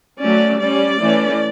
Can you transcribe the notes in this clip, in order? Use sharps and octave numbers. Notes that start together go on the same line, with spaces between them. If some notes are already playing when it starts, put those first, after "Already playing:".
F#3 A3 C#4 D5
G3 C#4 D5
E3 A3 C#4